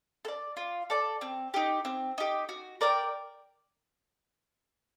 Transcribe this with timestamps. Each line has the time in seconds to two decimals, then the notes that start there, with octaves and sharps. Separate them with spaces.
0.25 A4
0.28 D5
0.57 F4
0.90 A4 D5
1.21 C4
1.54 D#4 G4
1.85 C4
2.18 D#4 G4
2.49 F#4
2.81 A#4 D5 G5